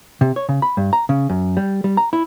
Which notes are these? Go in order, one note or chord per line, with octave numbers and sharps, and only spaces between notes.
C3
C#5
C#3
B5
G2
A#5
C#3
F#2
G3
G3
A#5
E4